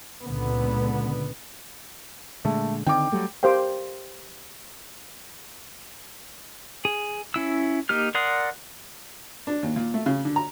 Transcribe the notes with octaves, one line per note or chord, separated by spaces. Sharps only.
C#2 A#2 D3 B3
A#2 D3 G#3 A3
D3 D#3 C4 G5 D6
F#3 G3 A3
G4 A#4 C5 F5 G5
G#4
C#4 E4 E6
A#3 D#4 G4 F6
A#4 D5 F#5 C6 D#6
D4
D#2
A#2
A3
C#3
D3
A#5